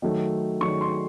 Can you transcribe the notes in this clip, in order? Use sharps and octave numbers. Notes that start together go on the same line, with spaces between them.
D#3 F#3 A3
D#3 F#3 A3 C#6
C6